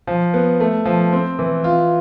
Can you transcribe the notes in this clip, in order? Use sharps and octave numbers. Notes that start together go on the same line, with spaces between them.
F3
B3
A3
F3
C4
E3
F4